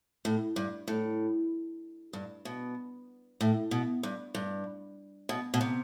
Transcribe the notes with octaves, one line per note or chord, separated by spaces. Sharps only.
A2
G2
A2
G2
B2
A2
B2
G2
G2
B2
B2
C3